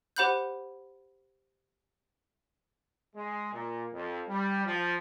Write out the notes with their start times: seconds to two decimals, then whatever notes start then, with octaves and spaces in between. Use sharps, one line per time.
0.16 G4 C5 F#5 B5 F#6 G6
3.16 G#3
3.53 A#2
3.93 F2
4.28 G3
4.66 F3